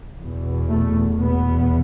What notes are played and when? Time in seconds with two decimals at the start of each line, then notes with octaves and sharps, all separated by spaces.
0.18 E2 B2
0.70 A3
1.21 E2 B2 B3